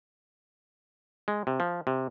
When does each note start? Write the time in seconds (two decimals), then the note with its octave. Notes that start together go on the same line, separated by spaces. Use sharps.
1.28 G#3
1.47 C3
1.60 F3
1.87 C3